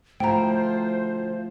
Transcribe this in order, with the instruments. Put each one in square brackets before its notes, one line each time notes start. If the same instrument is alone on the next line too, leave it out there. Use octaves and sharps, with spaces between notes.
[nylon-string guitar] D2 F3 E4 [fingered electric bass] A3 [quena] C5 [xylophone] G5 A#5